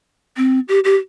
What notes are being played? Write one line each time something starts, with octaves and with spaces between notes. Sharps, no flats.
C4
G4
G4